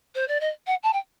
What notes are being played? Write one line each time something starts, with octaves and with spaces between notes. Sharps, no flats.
C5
D5
D#5
F#5
A5
G5